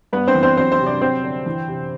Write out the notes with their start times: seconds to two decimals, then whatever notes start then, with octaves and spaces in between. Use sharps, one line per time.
0.13 G2 B3 B4
0.27 C4 C5
0.35 E3
0.43 C4 C5
0.57 F#3 C4 C5
0.72 C4 C5
0.79 C3
0.86 D4 D5
1.01 F#3 C4 C5
1.24 D3
1.46 E3
1.68 C3